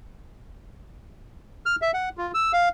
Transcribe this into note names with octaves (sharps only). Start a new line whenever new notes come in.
F6
E5
F#5
F4
E6
F5